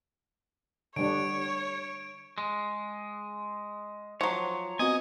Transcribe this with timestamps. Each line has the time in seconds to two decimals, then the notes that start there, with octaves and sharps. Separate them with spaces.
0.96 D3 G3 D4 C#5 D7
2.38 G#3
4.21 F3 F#3 C#5
4.79 B3 C4 F#4 D#5 G#5